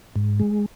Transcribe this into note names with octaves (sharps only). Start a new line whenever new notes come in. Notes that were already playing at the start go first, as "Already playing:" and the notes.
G#2
G#3